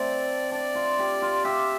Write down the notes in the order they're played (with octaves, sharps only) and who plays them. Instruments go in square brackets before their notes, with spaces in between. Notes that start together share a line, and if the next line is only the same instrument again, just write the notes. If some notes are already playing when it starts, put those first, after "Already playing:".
Already playing: [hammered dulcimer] A3 C4 [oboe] D5
[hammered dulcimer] D4 [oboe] D5
[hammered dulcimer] F4
G4
F4
[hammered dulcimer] G4 [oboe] E5